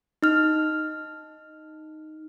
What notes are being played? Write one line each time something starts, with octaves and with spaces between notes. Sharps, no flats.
D#4 F6